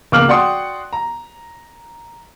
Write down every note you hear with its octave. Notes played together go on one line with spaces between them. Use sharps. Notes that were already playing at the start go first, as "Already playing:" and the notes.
C#2 A#3 D6 F6 F#7
F#4 D5 F#5 G5 C6 D#6
A#5